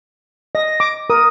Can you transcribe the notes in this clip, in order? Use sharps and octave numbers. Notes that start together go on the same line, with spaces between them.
D#5 A#6
D6
A#4 D#6